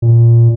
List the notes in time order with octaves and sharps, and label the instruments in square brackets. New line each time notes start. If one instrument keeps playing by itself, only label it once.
[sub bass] A#2